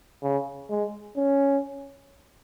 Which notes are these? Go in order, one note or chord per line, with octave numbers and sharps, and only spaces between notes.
C#3
G#3
C#4